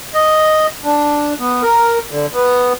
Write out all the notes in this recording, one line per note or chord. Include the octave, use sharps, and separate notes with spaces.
D#5
D4
B3
A#4
D3
B3